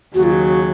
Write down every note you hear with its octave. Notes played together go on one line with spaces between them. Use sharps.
D#2 C#3 F#3 F#4
F4
F#4